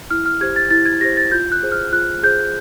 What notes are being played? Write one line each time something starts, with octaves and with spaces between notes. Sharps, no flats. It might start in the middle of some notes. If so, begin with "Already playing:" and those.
E4 F6
F6
G4 C5 G#6
A6
E4 A6
G#6
G4 C5 A#6
A6
F4 G6
F#6
G#4 C5
F6
F4 F#6
G#4 C5 G6